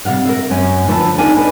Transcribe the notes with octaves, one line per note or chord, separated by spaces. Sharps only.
C3 G3 F5 F#5
A#4 E5
F#2 C#4 G#5
D2 F3 B4 E5 G#5 A5
D#2 D#3 D4 G#4 F5 G#5
B4 D5 D#5